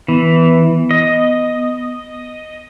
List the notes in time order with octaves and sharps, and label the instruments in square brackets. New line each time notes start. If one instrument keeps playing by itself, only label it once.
[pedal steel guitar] E3 [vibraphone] B3
[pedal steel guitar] D#5